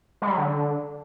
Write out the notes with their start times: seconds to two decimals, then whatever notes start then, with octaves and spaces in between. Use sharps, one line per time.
0.22 G#3
0.27 G3
0.32 F#3
0.38 D3